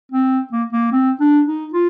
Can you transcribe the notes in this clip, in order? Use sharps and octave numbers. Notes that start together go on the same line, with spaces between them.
C4
A#3
A#3
C4
D4
D#4
F4